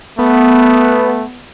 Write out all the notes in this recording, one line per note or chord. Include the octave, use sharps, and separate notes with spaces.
A3 B3